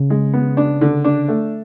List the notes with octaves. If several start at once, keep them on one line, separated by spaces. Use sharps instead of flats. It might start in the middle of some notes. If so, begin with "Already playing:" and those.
Already playing: C#3
G#3
B3
D4
D3
D4
A3